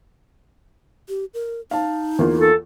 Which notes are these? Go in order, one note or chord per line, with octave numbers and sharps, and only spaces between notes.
G4
A#4
D#4 F5 A5
E2 A#3 F4
A4